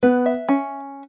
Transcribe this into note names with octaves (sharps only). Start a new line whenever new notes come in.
B3 B4
E5
C#4